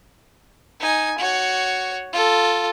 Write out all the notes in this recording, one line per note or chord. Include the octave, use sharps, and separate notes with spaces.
D#4 G#5
F#4 C#5
F4 A4